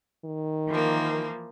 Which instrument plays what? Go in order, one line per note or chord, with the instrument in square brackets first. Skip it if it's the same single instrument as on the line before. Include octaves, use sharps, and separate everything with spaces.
[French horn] D#3
[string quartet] E3 F3 A#3